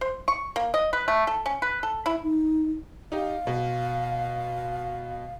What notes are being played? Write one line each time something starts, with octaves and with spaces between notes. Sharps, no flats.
C5
C#6
A#3
D#5
B4
A3
A4
C#4
B4
A4
E4
D#4
D#4 G4 F5
B2